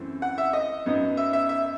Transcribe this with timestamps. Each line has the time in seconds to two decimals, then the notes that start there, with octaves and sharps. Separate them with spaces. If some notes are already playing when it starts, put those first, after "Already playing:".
Already playing: F#2 E3 A3 C4
0.22 F#5
0.38 E5
0.53 D#5
0.86 F#2 F#3 B3 D#4
1.17 E5
1.33 E5
1.49 E5